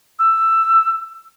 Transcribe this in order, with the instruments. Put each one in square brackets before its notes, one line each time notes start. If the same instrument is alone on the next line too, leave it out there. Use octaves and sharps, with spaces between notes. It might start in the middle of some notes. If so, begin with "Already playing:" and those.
[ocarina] E6